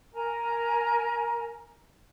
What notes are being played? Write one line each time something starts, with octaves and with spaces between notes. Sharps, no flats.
A#4 G#5 A#5